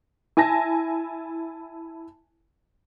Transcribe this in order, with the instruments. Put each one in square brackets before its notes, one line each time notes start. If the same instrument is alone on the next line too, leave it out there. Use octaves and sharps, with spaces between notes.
[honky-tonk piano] E4 G#5 A5 A#6